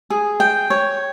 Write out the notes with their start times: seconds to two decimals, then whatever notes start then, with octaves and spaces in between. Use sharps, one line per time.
0.10 G#4
0.40 G5
0.70 C#5